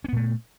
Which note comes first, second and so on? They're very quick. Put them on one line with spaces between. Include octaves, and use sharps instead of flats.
C#4 B3 A#2 A3